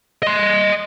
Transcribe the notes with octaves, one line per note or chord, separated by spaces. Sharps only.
D#5 C6